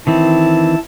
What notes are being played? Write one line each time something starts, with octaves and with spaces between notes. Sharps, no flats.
D#3 E3 C4 E4 A5